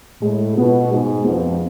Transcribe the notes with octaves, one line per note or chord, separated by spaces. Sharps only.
A2 G#3
B2 B3 F4
G#2 G#3
F2 B3 F4